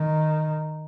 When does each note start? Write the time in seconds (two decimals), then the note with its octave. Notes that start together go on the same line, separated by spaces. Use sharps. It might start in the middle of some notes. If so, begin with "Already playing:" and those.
Already playing: D#3